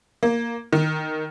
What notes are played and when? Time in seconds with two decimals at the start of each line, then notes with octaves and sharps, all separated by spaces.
0.23 A#3
0.73 D#3